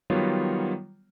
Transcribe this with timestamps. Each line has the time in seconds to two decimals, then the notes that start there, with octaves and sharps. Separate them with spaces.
0.10 D#3 F#3 G3 B3 F4 C#5